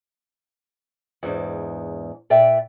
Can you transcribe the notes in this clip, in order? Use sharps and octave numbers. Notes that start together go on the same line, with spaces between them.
E2 G#2 D4
A#2 D5 E5 G5